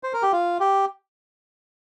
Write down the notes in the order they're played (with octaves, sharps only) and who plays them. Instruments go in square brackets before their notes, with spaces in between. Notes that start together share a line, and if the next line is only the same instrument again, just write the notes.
[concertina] C5
A#4
G4
F4
G4